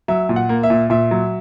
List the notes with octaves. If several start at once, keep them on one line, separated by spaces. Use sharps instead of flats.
F#3 E5
A#2
F#5
A#3
E5
A#2
A#2 E5
F#3